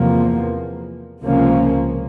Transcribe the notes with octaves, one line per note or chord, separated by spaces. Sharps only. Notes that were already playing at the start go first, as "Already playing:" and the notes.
Already playing: E2 C3 F3 A#3
C#2 C3 F3 A#3 C#4